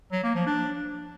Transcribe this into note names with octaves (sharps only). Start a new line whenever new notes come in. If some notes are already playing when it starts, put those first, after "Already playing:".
F#3
A#3
F3
D4